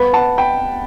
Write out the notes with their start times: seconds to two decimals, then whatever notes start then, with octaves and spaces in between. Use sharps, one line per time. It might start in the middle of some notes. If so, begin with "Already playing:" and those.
Already playing: B3
0.13 F#5 A5
0.38 G5 B5